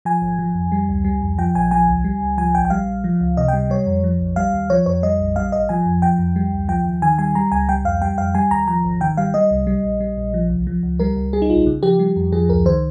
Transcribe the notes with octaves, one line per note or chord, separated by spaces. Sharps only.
F3 G#5
G#1
F3
F2
G3
C#2
G3
F2
F3 G5
A#1 G#5
F3 G#5
C#2
G3
C#2
F3 G#5
A#1 G5
G5
G3 F5
A#1
F3
C#2
C3 D#5
G3 G5
G3 C#5
F2
F3
A#1
G3 F5
D#2
F3 C#5
F2 C#5
G3 D#5
A#1
G3 F5
G#1 D#5
F3 G#5
F2
F3 G5
F2
G3
C#2
F3 G5
D#2
D#3 G#5
G3 G#5
G3 A#5
C#2 G#5
G3 G5
F2 F5
G3 G5
F2 F5
G3 G#5
D#2 A#5
F3 A#5
G#1
D#3 G5
G3 F5
G3 D#5
C2
G3
A#1
G3
A#1
F3
C2
F3
C#2
G3 A#4
C#2
G3 G#4
D#4
A#1 F4
C#3
F3 G4
G3
F2
F3 G#4
C#2 A#4
D#3 C5